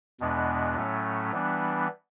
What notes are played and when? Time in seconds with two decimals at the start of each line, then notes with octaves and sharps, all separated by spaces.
0.20 E2 B2 G#3 B3 D4
0.76 A2 F#3 A3 C#4
1.33 E3 G3 B3 D4